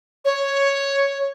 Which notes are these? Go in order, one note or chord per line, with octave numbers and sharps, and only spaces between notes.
C#5